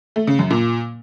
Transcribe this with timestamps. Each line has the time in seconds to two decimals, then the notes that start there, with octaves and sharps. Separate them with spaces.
0.16 A3
0.27 C#3
0.39 F#2
0.51 A#2